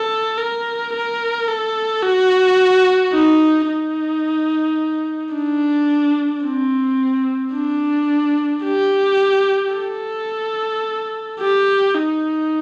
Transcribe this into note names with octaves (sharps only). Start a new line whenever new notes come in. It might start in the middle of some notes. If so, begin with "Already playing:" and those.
Already playing: A4
A#4
A#4
A4
F#4
D#4
D#4
D4
C4
D4
G4
A4
G4
D#4